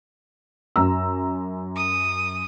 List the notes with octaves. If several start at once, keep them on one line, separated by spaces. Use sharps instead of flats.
F#2 A#5 E6
D#6